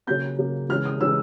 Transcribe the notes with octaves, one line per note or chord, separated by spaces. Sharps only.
C#3 F#3 A#3 G6
C#3 F#3 A#3
C#3 E3 G#3 F6
D#6
C#3 E3 G#3 E6